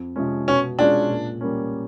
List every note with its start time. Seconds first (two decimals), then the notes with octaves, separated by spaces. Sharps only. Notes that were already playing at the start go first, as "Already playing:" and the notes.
Already playing: F2
0.16 C3 F3 G#3 C#4
0.48 B2 C#4
0.78 G#3 C#4 D4 F4 G#4
1.09 A#2
1.41 G3 A#3 C#4